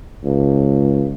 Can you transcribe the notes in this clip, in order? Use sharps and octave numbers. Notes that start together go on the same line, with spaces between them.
C#2